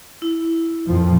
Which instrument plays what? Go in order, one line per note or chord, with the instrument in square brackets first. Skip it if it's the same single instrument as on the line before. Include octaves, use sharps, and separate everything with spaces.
[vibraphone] E4
[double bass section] F2 A#2 F3